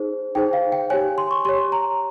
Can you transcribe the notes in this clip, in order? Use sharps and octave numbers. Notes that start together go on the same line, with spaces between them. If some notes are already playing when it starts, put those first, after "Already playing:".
Already playing: D#4 G#4 C5
D#4 G#4 C5 G5
F5
G5
G4 C#5 G#5
C6
C#6
G4 C#5 C6
A#5